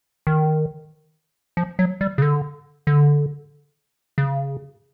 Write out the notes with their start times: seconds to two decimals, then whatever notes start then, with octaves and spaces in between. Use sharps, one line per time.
0.27 D#3
1.57 F3
1.79 F#3
2.01 G3
2.18 C#3
2.22 D3
2.87 D3
4.18 C#3